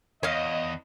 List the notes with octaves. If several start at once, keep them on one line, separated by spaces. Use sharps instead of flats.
E2 C#5 D#5 F5